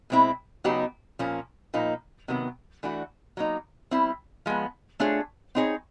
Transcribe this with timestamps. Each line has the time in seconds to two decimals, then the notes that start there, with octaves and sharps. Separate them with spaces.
0.10 B2 G#3 C4 E4
0.64 C#3 F#3 B3 D#4 G4
1.19 A#2 F3 A#3 C#4
1.74 A#2 F3 A#3 D#4
2.28 C3 D#3 F#3 B3
2.83 E3 A3 D4 F#4
3.37 F#3 A#3 D#4
3.91 G3 C4 E4
4.46 F3 G#3 B3
5.00 A3 D4 F4 G#4 C#5
5.55 C4 D#4 G#4 C#5